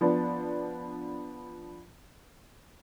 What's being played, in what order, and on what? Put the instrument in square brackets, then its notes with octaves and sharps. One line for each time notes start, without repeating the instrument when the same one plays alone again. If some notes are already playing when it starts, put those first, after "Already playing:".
[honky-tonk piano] F3 B3 D4